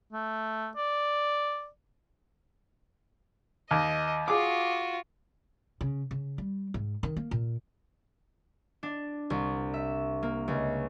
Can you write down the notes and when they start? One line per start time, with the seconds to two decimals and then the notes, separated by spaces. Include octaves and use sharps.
0.13 A3
0.76 D5
3.71 D#2 D#5
4.28 F4 F#4 G#4 D6
5.81 C#3
6.11 C#3
6.38 G3
6.74 G#2
7.03 D#3
7.17 A#3
7.31 A#2
8.83 D4
9.30 C2
9.74 E5
10.23 A#3
10.48 C#2